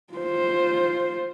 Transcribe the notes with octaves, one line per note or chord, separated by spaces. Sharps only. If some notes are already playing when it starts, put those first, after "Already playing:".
F4 C5